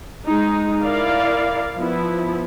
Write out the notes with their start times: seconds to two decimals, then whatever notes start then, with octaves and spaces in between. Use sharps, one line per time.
0.25 G#3 D#4
0.82 E4 A#4 D5 F5
1.78 F3 B3 E4